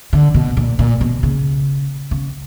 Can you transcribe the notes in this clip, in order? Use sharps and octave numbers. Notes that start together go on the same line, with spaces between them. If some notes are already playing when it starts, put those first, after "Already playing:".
D3
B2
A#2
A#2
B2
C#3
C#3